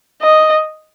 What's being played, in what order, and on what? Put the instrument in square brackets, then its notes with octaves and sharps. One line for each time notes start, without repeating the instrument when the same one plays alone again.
[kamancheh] D#5